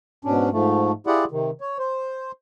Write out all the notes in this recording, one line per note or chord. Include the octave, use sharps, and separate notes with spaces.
G#2 B2 C#4 D4
G#2 F3 A3
E4 F4 G4 G#4 D5 F#5
C3 D#3
C#5
C5